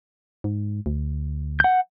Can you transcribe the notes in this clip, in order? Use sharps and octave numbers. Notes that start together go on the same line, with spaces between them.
G#2
D2
F#5 G6